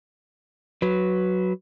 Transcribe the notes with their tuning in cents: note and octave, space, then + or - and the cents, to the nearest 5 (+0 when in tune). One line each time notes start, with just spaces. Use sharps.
F#3 +0 B4 +0